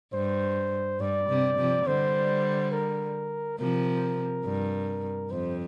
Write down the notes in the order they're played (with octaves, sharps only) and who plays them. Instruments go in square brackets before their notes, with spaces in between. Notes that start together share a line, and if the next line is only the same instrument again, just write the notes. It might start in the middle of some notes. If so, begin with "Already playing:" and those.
[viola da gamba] G2 [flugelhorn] C5
[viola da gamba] G2 [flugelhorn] D5
[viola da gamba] C3
C3 F3
[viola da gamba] D3 G3 [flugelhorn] C5
[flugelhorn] A#4
[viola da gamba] C3 F3 [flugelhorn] A#4
[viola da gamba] G2
[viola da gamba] F2 [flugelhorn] C5